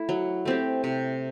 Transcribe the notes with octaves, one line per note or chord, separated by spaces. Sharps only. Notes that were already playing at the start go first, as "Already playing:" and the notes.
Already playing: A3 E4
F#3
A3 C4 G4
C3